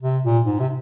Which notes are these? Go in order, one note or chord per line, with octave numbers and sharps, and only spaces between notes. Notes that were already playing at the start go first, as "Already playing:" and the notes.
C3
A#2
G#2
C3